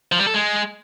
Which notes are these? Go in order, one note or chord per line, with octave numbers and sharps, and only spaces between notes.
F3
G3
A4
G#3